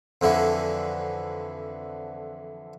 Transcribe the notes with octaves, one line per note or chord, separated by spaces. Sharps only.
F2 D3 E3